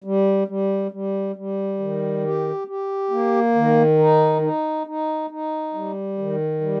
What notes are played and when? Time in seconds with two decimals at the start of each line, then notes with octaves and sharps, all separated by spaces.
0.04 G3
0.48 G3
0.91 G3
1.36 G3
1.80 D#3
2.23 G4
2.68 G4
3.10 A#3
3.55 D#3
3.99 D#4
4.42 D#4
4.87 D#4
5.30 D#4
5.74 G3
6.18 D#3
6.61 G3